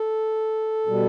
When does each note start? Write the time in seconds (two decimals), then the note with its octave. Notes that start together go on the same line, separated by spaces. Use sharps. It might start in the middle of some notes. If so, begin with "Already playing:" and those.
Already playing: A4
0.87 B2 G3